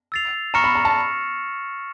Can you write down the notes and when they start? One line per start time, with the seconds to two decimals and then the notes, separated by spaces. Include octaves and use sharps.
0.12 E6 A6 C7 F7
0.54 A#5 C#6 F6 A#6 C#7 E7
0.64 B5
0.75 A#5
0.85 A5